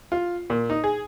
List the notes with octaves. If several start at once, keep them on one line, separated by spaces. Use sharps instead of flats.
F4
A#2
D#4
G#4